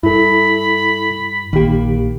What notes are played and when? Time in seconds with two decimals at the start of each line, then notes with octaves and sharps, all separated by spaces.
0.03 G2 E4 A4 B5
1.53 A#1 D#3 A#3 G4